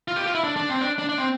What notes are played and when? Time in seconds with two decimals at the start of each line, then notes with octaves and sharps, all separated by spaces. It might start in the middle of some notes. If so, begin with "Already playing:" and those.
0.08 F4
0.16 G4
0.26 F4
0.35 E4
0.44 D4
0.56 D4
0.69 C4
0.81 D4
0.99 D4
1.09 D4
1.18 C4